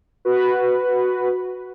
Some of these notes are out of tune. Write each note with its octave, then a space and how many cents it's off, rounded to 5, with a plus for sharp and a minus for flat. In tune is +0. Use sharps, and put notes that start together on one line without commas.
F#4 +0 B4 +0